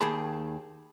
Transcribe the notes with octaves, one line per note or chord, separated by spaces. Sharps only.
D#2 D#3 G#4 A5 B5